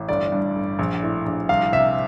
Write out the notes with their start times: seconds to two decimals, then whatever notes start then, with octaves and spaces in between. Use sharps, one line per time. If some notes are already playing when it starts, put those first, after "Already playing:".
Already playing: A1
0.08 G1 D5
0.32 G2
0.56 G1
0.79 A#1
1.02 A2
1.26 A#1
1.49 C2 F5
1.72 C3 E5